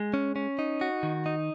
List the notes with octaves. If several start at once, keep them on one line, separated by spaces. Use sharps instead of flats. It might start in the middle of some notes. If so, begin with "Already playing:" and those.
Already playing: G#3
C#4
C#4
D#4
F#4
D#3
D#4